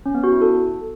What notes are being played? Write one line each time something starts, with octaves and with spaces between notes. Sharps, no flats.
C#4
B3
F#4
E4
A4